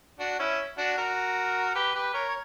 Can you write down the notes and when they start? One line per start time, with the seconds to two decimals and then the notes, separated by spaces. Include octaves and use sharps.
0.20 D4 F#4
0.39 C#4 E4
0.78 D4 F#4
0.98 F#4 A#4
1.75 G4 B4
1.95 G4 B4
2.14 A#4 C#5
2.28 C#5